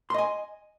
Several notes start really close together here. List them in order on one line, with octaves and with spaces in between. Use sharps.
C6 D#5 G#5